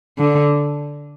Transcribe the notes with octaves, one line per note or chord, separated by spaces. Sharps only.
D3